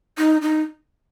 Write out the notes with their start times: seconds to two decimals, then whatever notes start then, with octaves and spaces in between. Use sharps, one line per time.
0.18 D#4
0.42 D#4